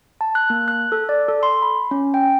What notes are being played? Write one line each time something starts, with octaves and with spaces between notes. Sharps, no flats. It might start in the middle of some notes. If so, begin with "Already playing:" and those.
A5
F#6
A#3
F#6
A4
D5
A4
C6
B5
C#4
G5